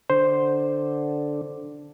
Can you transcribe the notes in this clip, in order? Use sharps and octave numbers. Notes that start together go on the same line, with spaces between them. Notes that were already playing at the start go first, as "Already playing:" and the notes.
D3 C5